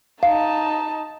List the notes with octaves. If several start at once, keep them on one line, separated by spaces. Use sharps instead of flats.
D#4 F5 A5